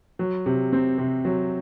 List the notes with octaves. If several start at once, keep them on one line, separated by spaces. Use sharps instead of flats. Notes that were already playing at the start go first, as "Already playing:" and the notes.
F#3
C3
C4
C3
F#3